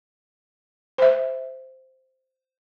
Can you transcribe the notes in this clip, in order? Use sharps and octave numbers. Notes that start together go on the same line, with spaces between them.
C5 E5